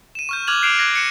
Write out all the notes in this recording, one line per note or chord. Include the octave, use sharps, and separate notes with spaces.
D#7 E7
C#6 F6 G6
D6 F6 F#6 G#6 F7 F#7
F#6 G6 C7 D7 E7 F7
F#6 G#6 A#6 C7
C#7 D#7 E7